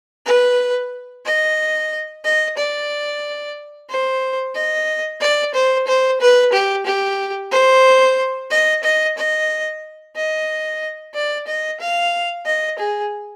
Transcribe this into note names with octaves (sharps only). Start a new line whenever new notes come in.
B4
D#5
D#5
D5
C5
D#5
D5
C5
C5
B4
G4
G4
C5
D#5
D#5
D#5
D#5
D5
D#5
F5
D#5
G#4